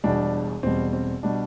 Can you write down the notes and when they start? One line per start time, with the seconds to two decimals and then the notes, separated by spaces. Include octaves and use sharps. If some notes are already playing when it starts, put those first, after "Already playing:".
0.04 E1 E2 B2 G3 D4
0.63 E1 E2 B2 G3 C4
0.93 C4
1.23 B2 G3 D4